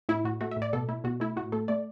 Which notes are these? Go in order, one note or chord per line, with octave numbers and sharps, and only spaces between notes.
A2 E4
A2 F#4
A3 F#4
E5
A2
D5
B2 A4
A3 E4
B2 F#4
A3 E4
A2 F#4
A3 A4
A3 D5